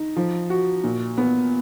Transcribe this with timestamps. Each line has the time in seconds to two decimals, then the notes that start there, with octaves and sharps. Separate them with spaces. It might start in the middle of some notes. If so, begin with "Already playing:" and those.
Already playing: D#4
0.16 F3
0.50 F#4
0.84 A#2
1.18 B3